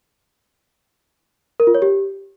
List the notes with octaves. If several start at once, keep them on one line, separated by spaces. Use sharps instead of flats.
A#4
F4
C#5
G4